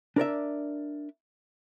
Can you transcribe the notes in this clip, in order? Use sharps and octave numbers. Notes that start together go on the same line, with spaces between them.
D4 A#4 D5 E5